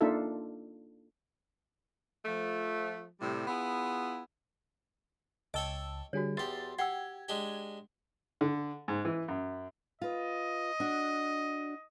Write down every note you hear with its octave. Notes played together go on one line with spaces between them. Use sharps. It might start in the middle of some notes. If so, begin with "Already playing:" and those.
A#3 D4 D#4 F4 A4 E5
F3 A3
A2 C3 G3
B3 E4 F4 G#4
C#2 C#5 D#5 G5 A5 D6 E6
D3 G3 F#4 G#4 C#5
E2 G4 C6 A6
G4 F#5 G5 E6 G#6
G#3 D4 G4
D3
G#2
E3
F#2
F4 B4 D#5
D4 F#4